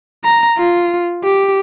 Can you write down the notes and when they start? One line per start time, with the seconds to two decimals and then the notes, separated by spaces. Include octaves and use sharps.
0.25 A#5
0.58 F4
1.24 G4